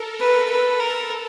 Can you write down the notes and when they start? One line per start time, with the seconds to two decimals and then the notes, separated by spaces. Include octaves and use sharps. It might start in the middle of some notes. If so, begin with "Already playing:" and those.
Already playing: A4 A#4
0.20 B4
0.49 A4 B4
0.80 A#4